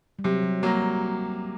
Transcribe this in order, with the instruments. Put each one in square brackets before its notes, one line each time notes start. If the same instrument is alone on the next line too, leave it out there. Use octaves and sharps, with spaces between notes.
[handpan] G3
[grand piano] C3 [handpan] F#3
[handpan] F#3
[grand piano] F#3 A#3 [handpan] G3